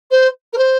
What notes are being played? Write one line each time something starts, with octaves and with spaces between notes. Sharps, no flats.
C5
A#4
C5